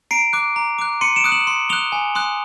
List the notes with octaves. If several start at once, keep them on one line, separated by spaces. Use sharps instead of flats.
A#5 C7 D7
D6 F#6
A#5
D6 F#6
C6 C#7 D#7
D7 E7
D#6 F#6
E7 F#7
C6
D#6 F#6 F7 G7
G#5
C6 D#6 F#6